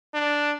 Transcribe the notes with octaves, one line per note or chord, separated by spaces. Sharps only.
D4